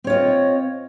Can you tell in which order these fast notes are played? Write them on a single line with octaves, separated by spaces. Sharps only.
C4 C#5 F4 D#5